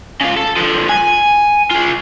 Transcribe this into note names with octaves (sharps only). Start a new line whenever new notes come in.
C#3 F4
A4
D3 F3
G#5
F4 G#4